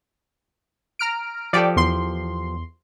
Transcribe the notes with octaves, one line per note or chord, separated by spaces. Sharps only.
A#5 F6 D7
F3 G4 A4 D5 G5
E2 C6